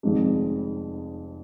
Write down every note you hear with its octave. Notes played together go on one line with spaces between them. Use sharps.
F1 F2 D#3 G#3